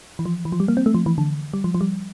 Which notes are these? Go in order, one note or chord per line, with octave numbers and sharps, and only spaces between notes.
E3
F3
E3
F3
G3
A#3
C4
A3
F3
E3
D3
G3
F3
F3
G3